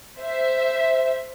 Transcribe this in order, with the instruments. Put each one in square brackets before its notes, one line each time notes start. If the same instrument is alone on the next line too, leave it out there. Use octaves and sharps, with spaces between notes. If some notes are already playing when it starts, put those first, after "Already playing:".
[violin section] C5 E5